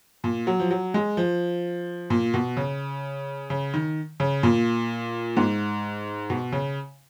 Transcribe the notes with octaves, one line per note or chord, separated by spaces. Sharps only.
A#2
F#3
F3
F#3
G#3
F3
A#2
B2
C#3
C#3
D#3
C#3
A#2
G#2
B2
C#3